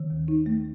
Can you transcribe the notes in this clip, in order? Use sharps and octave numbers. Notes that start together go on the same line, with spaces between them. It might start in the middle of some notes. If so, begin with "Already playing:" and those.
Already playing: D#3
D#2
D#4
A3